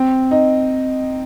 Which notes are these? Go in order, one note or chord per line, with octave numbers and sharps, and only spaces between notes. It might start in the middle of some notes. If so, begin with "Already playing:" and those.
Already playing: C4
D#4